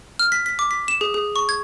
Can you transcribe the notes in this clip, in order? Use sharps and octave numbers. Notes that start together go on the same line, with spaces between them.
F6
B6
B6
D6
B6
E7
G#4
G#4
C#6
G#6